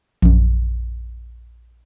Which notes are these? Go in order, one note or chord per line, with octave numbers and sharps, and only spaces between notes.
A#1 F#2